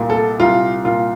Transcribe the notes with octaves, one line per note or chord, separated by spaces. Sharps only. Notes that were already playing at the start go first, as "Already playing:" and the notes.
Already playing: C2 A#2
A4
C2 F4
A#2 F4